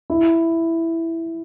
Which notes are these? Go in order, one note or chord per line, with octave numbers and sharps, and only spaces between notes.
E4